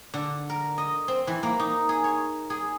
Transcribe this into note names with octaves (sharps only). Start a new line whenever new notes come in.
D3
A#4
D#5
C4
E3
A#3
D#4
G#4
C#5
G#4